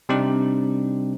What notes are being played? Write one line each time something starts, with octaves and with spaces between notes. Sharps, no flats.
C3 G3 C4 D4 D#4 G4